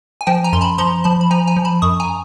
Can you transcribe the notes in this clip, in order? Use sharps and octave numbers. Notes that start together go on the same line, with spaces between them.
G#5
F3 G5 A5
G#5 A#5
F#2 C6
A5 B5
F3 A#5 C6
F3 A5 B5
B5
F3 G#5 A#5
G#5 A#5
F3
A5 B5
F#2 C#6 D#6
G#5 A#5